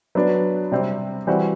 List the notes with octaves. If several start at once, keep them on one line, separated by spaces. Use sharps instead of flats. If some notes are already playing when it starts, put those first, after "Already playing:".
F#3 B3 D4
C3 G3 C4
E3 G3 C4 F#4